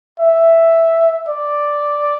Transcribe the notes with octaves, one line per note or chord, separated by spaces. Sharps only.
E5
D5